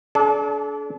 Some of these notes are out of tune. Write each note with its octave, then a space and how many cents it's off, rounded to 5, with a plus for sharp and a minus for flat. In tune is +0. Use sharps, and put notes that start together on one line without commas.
D4 -25 A4 -45